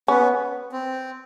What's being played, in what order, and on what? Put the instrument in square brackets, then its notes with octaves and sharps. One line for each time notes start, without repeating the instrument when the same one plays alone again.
[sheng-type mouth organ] B3 [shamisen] C#4
[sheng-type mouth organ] C4